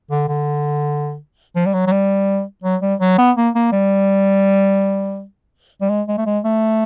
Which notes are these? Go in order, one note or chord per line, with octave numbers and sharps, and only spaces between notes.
D3
D3
F3
G3
F#3
F#3
G3
F#3
G3
F#3
B3
A#3
A#3
G3
G3
G#3
G#3
A3
G#3
A3